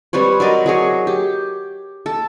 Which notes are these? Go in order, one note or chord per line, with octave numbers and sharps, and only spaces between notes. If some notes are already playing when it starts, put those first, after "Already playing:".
G3 C4 B4 C#5
F#3 A#4 D5 D#5
F#3 G#4 C#5
G4
A4